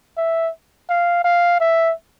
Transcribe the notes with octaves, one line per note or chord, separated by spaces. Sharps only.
E5
F5
F5
E5